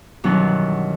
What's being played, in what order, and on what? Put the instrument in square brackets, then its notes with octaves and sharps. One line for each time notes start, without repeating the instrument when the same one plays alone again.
[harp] E2 G2 B2 D#3 F#3 C#4